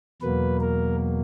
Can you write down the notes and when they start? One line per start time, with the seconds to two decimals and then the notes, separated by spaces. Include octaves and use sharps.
0.22 E2 B2 F#3 A#3 B4
0.61 A#4